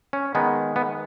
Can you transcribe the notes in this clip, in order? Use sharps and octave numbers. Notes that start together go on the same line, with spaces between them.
C#4
D#3 G#3 B3
B3